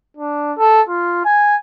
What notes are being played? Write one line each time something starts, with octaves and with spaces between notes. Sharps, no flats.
D4
A4
F4
G#5